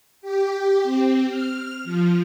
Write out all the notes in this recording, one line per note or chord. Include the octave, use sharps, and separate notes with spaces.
G4
C4
F6
F3